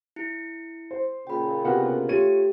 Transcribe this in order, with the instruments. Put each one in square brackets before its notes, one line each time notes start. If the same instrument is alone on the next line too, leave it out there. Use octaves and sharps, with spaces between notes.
[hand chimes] E4 C#7
[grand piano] C5
[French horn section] A#2 C#3 [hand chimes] G5 B5
[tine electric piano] C3 B3 A#4 [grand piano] F#4 G4 F#5
[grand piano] A3 D#7 [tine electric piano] F4 C#5 [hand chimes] G4